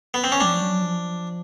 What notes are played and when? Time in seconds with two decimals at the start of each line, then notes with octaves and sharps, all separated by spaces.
0.14 B3
0.24 C4
0.32 C#4
0.40 F3 D4
0.61 F#3
0.82 F3